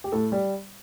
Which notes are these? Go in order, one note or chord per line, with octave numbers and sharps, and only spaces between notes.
G4
A2 A4
G3